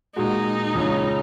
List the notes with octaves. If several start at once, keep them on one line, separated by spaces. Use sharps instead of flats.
A#2 G#3 D#4 F#4
C#2 C#3 G#3 C#4